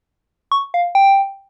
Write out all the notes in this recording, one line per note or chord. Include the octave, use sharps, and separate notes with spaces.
C#6
F5
G5